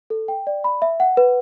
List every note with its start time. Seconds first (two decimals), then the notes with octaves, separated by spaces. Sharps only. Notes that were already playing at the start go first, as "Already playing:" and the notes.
0.10 A4
0.28 G5
0.47 D5
0.64 B5
0.82 E5
1.00 F#5
1.17 B4